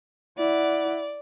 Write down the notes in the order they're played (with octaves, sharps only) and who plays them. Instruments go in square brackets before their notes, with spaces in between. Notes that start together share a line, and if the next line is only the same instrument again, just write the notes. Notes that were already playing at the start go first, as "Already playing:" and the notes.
[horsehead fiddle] E4 F#5 [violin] D5